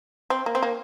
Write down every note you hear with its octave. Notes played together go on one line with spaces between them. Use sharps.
C4
A#3
C4
A#3